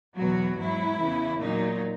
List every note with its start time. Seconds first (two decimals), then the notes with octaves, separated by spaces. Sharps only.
0.15 E2 B2 F#3 F#4
0.57 G#2 F#3 E4
0.98 E2 C#3 E3
1.40 A#2 F#3 D#4